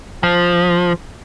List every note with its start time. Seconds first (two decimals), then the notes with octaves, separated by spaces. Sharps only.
0.23 F3